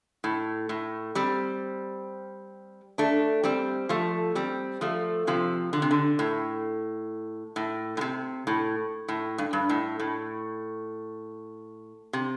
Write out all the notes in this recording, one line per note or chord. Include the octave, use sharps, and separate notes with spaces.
A2
A2
G3 C4
A3 D4
G3 C4
F3 A3
G3 C4
F3 A3
C3 F3
D3
C3
D3
A2
A2
A2
C3
A2
A2
G2
G2
A2
A2
C3